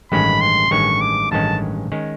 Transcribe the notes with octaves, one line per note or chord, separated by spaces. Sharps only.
A1 G2 D#3 G#3 C#4 B5
C6
A1 G2 D#3 G#3 C#4 C#6
D6
A1 G2 D#3 G#3 C#4 A5
D#3 G#3 C#4